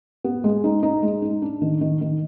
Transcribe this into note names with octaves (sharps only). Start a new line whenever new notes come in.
B3
G#3
D#4
D#4
G#3
D#4
D4
D#3
D#3
D#3